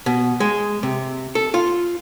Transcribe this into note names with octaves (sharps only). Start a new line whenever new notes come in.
B2
G#3
C3
A4
F4